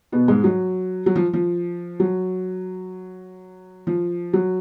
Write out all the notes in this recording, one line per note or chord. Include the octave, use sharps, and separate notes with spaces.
B2 B3
G#2 G#3
F#3
F#3
F3
F3
F#3
F3
F#3